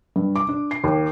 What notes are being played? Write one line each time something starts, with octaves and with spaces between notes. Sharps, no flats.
G2
D6
D4
C7
D#2